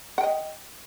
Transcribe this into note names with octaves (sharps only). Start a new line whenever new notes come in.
D#5 F#5 G5